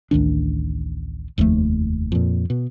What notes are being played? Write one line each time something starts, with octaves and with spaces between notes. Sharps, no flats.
A1 D2 D#3 D4
F1 D#2 F3 A3
F2 A#2
B2